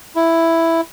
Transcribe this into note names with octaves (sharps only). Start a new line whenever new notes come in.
E4